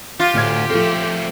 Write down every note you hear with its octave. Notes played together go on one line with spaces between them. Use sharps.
F4 G4
D2 A2 F6 G#6
F3 A3 C4 A4